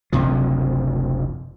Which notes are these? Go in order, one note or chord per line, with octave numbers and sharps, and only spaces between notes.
F#1 D2 C3 F3